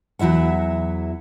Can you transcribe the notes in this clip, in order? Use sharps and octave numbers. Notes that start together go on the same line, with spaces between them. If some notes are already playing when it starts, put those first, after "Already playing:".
E2 F#3 E4 E5 F#5